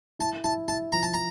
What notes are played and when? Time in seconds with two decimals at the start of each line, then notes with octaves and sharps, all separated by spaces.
0.19 E4 A5
0.44 E4 A5
0.68 E4 A5
0.92 F3 A#5
1.03 A5
1.14 A#5